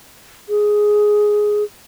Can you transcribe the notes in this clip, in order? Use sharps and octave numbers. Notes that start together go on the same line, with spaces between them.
G#4